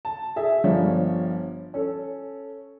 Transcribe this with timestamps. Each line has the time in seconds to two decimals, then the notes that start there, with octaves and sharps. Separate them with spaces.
0.05 A5
0.36 G#4 E5
0.64 G1 G2 F3 G3 C#5
1.74 C#4 A4